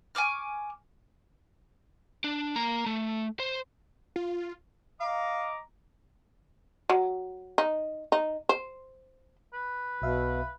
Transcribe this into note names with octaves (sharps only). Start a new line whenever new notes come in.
G#5 C#6 D6 F6
D4
A#3 A#5
A3
C5
F4
D#5 F5 A#5 D6
F#3
D#4
D#4
C5
B4
B1 B2 E5 F5